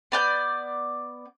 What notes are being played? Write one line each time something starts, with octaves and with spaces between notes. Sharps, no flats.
B3 D5 G6